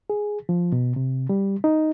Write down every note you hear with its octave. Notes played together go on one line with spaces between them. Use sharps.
G#4
F3
B2
C3
G3
D#4